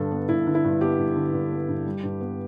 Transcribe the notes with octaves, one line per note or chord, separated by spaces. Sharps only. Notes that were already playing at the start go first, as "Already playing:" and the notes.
Already playing: G2 D3 A4
B3
G2 E4
D3
E4
G2
B3 G4
G2
D3
G2
B3
G2
G3
G2
B3